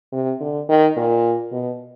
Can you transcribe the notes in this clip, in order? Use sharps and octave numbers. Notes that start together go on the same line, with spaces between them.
C3
D3
D#3
A#2
B2